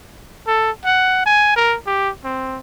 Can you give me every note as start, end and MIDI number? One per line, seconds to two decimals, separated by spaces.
0.47 0.71 69
0.85 1.25 78
1.26 1.52 80
1.56 1.77 70
1.86 2.10 67
2.24 2.58 60